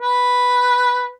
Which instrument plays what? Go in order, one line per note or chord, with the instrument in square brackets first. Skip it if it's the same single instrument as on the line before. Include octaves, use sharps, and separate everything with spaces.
[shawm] B4